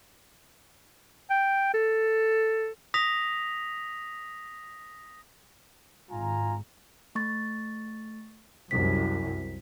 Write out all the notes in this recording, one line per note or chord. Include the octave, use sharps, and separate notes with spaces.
G5
A4
D#6 A#6 B6 F7
G#1 G#2 F4 G#5 A#5
A3 C#6 A6
C2 F#2 B6